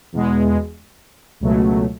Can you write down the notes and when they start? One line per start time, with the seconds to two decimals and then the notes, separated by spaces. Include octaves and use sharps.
0.12 E2 B2 G#3
1.40 C#2 B2 F#3 A3